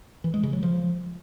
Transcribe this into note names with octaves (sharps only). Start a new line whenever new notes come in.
E3
G#3
C#3
F#3
F3